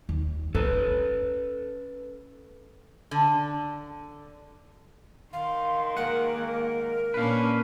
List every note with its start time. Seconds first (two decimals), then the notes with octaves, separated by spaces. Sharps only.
0.09 D#2
0.55 C#4 A4 B4
3.11 D3
5.33 D#3 F5 C6
5.97 G#3 A#3 A#4 F#5
7.14 A#2 A#3 C#4 D4 B4 F5